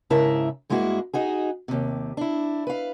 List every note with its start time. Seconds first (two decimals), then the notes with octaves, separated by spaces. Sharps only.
0.10 G#2 C#3 E4 A#4 E5 A5
0.70 G2 G#3 A#3 E4 F#4
1.13 D#4 F#4 G#4
1.68 D#2 C3
2.17 D4 E4
2.67 B4 F5